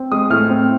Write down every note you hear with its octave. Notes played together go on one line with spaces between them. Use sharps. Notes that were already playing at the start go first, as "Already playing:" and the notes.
Already playing: C4
G#3 D#6
A2 F6
C4